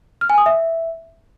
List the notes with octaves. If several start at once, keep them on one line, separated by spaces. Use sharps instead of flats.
F6
G#5
D#6
E5